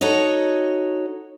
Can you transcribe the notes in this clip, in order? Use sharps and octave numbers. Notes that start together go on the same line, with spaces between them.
D#4 F#4 A4 C#5 D#5